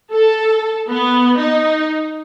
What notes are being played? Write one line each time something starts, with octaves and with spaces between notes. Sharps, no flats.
A4
B3
D#4